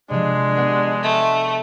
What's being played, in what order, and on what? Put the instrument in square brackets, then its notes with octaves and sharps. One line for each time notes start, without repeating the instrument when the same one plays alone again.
[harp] C3 F3 [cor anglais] G#3 [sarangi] D4
[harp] B3 F#4 B4
[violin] A3